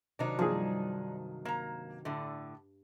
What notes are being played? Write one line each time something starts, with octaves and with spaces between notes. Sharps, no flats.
C3 D#3 F#3 D4 D#4
G2 F3 G#4
A#3 A#5
A2 D3